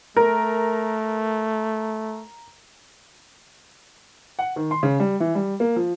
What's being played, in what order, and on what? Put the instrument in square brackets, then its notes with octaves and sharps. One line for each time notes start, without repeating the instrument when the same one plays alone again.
[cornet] A3 [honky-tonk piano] A#4
[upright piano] F#5
D#3
C6
C#3
G3
E3
G3
A#3
F3